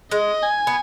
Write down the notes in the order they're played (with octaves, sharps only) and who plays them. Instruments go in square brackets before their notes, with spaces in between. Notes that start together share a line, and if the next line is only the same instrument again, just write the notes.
[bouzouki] G#3 [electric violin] D#5
[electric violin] G#5
[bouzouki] B3